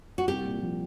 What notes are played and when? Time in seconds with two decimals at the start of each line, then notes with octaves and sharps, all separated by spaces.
0.18 F#4
0.28 C2 G4
0.45 A#2
0.62 F3